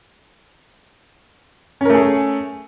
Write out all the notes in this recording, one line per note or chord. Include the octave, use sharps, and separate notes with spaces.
A3 C#4 G#4 A#4